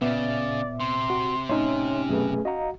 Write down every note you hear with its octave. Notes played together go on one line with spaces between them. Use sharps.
A#2 C#3 B3 D5 E5 D6
C3 C6
F#4
A2 C#4 D#4 C#5 E5 C6
F#2 B2 A3 G#4 B4
F#4 D#5 F5 A#5